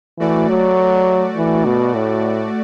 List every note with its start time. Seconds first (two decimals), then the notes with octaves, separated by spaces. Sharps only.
0.19 E3 A3 F#4 D5
0.49 F#3
1.36 E3
1.65 B2
1.95 A2